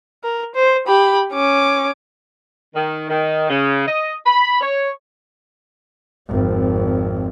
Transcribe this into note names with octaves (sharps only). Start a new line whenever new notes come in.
A#4
C5
G4 B5
C#4 D6
D#3
D#3
C#3
D#5
B5
C#5
G#1 F2